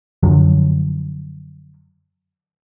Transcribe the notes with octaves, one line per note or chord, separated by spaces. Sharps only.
F#2 D3 F3 F#3